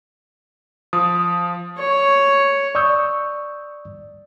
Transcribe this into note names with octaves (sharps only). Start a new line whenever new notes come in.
F3 D#6
C#5
D5 C#6 D#6 E6 G6